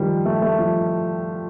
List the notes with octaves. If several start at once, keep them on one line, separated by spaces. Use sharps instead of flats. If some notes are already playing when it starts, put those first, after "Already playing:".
Already playing: D#3 F3 G3
A3
A3
F3